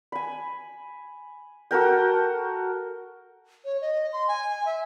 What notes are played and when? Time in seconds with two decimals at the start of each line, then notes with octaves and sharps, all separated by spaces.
0.12 G#5 B5
1.71 F#4 A4 A#4 G5
3.65 C#5
3.81 D#5
4.13 C6
4.28 G#5
4.66 E5